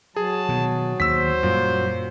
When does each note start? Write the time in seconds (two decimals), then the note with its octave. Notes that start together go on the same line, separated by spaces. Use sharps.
0.16 F#3 G#4 A5
0.49 B2 D#3
1.00 D#2 C5 E6 B6
1.43 F#2 A#2 G3